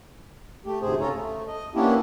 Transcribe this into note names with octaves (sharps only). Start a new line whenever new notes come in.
A3 G4
D2 G#2 C3 G#4 C5
C#3 C#4 F4 A4 C#5 A#5
A3
D#5
A#3 B3 C#4 D4 E4 G4